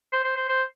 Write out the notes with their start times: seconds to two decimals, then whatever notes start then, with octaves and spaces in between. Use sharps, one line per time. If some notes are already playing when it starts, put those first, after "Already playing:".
0.13 C5
0.24 C5
0.36 C5
0.49 C5